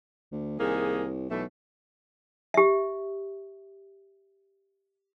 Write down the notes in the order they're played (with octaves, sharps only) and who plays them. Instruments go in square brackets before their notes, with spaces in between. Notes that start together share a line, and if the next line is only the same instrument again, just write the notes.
[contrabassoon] D2
[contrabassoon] C2 [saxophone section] D#3 A#3 G#4
[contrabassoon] B1 [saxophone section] B2 E3 A3
[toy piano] G4 E5